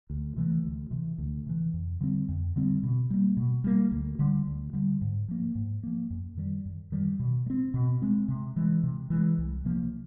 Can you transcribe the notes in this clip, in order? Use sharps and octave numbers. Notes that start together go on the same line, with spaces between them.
D2
C3 E3 A3
D2
C3 E3
D2
C3 E3
F2
D3 G3 C4
F2
D3 G3 C4
B2
G3 A#3
B2
G3 A#3
D2
D3 G3
D2
D3 G3
G#2
F3 A#3
G#2
F3 A#3
F#2
D#3 G3
F#2
D#3 G3
B2
G#3
C4
B2
G#3 C4
C3
E3 G#3
C3
E3 G#3
C2
C3 F3 A#3